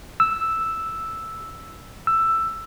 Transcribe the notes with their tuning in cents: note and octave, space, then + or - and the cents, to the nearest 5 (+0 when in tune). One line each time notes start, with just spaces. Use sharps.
E6 +0
E6 +10